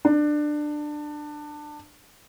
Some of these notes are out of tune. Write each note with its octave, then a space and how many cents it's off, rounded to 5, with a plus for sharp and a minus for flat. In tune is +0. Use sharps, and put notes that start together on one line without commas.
D4 +20